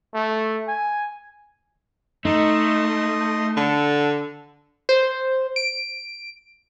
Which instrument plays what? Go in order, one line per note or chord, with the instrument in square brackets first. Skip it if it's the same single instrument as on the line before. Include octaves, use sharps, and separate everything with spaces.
[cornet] A3
G#5
[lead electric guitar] A3 [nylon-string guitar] D#4 [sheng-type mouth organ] D#5 C6
[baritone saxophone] D3 [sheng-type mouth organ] A4
[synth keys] C5
D7